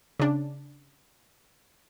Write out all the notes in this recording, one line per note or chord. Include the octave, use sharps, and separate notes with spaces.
C#3 D4